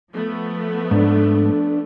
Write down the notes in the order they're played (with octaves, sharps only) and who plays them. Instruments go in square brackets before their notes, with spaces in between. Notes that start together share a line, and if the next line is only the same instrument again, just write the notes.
[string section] F3 A3 B3
[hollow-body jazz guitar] G#2 [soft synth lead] D4